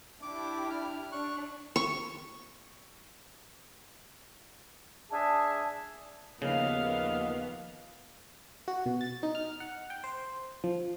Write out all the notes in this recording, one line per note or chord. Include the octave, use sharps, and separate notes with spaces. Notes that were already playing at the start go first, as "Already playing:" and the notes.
D4 E4 G4 D6
F6
D4 C#6 F#6
C#6
D4 G#4 E5 G#5 A5
D#2 C#3 F3 A#3 B3 D#5 F5
F#4
B2
A6
D#4
F6
F#5
G5
C5
F3